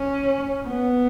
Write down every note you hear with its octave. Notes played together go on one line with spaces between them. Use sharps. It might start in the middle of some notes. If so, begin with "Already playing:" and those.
Already playing: C#4
B3